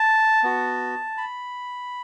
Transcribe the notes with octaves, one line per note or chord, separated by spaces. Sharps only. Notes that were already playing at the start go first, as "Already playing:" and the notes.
Already playing: A5
B3 F#4
B5